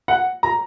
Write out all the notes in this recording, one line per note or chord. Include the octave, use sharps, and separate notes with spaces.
F#5
A#5